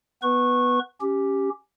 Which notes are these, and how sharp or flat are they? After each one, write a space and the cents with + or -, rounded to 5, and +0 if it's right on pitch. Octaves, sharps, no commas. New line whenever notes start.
B3 +0 B4 +0 C#6 -20
C#4 +0 G4 +0